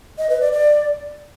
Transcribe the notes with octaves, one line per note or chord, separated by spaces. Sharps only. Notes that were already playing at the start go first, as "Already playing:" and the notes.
D#5
B4
D5
D5